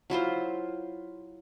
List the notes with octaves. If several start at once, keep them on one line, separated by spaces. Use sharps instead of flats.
F#3 E4 F4 C5